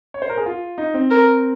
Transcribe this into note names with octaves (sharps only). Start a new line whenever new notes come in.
C#5
C5
A#4
G#4
F4
D#4
C4
A#4